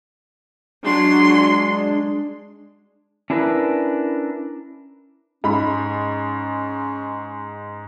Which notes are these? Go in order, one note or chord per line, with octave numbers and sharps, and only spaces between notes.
F#3 G#3 D4 C6
C#4 D4 E4 G#4 A#4 B4
G#2 C#4 B5